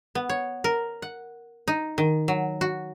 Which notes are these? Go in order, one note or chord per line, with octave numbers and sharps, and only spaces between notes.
B3
C#5
A#4
F#5
D#4
D#3
F#3
F#4